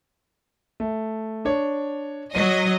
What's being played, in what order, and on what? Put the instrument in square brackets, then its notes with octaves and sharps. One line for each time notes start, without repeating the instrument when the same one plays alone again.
[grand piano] A3
D4 C#5
[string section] F#3 D#5 [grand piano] D#7